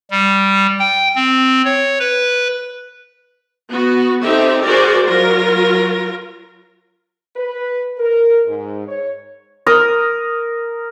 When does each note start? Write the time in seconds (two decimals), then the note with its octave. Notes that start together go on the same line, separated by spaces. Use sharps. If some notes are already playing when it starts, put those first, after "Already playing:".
0.11 G3
0.79 G5
1.16 C4
1.65 C#5
2.00 B4
3.70 B3 F#4
4.22 C4 D#4 G4 A4 E5
4.63 F#4 G#4 A#4 C5 D5
5.06 F#3 F4 A#4
7.36 B4
7.98 A#4
8.46 G#2
8.88 C#5
9.67 A#4 A#5 D#6